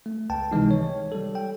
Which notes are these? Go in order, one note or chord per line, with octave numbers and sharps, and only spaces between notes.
A3
C#2 G5 A5
C3 D#3 E3 G#3 D#4
C#5
G3 A4
G5